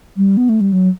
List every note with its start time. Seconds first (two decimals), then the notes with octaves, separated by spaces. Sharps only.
0.17 G3
0.37 B3
0.49 A3
0.61 G3
0.73 F#3